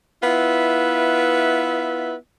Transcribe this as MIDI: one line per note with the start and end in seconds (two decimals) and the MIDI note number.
0.23 2.15 59
0.23 2.15 64
0.23 2.15 65
0.23 2.15 71
0.23 2.15 76